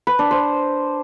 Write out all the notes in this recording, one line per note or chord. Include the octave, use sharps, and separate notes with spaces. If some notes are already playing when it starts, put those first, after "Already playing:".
B4
D4
C5